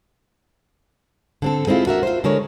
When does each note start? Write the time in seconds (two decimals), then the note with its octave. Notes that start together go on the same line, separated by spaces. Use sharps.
1.42 D3 C4 A4
1.67 G#3 C4 D4 E4 F4
1.86 D4 F#4 A#4 E5
2.03 F4 C5
2.24 D3 G#3 A#4 C#5